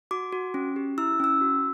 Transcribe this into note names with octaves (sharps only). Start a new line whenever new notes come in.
F#4 D6
F#4
C#4
G4
E4 E6
C#4 E6
F#4